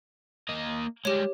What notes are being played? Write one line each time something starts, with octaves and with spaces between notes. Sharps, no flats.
A#3 D#5
G3 G#3 G4 C#5